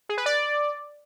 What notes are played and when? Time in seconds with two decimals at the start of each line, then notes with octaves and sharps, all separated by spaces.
0.09 G#4
0.18 B4
0.26 D5